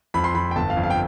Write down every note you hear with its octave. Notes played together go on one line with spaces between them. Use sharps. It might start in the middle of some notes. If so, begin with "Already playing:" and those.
F2 B5
C6
F2 B5
G5
G1 A5
F5
F2
F5
G5